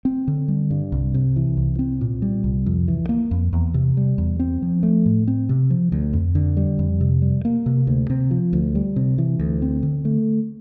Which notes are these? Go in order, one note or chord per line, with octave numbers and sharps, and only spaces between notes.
C4
D3
G3
G2
C2
C3
E3
C2
C4
A#2
G3
C2
F2
E3
A#3
F2
E2
C3
G3
E2
C4
F3
A3
A2
C4
C3
F3
D2
F2
D3
G3
F2
C3
G3
A#3
C3
D2
C3
F3
D2
G3
C3
E3
D2
C4
D3
A3